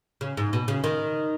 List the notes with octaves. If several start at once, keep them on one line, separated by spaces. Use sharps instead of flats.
C#3
G#2
B2
C#3
D#3